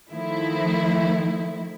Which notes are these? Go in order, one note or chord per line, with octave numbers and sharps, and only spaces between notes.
D#3 F3 A3 E4